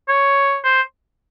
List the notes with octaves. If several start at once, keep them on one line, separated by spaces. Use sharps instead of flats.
C#5
C5